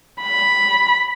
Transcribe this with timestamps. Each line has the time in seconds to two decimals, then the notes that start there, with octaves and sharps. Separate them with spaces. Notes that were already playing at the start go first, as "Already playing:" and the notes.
0.22 B5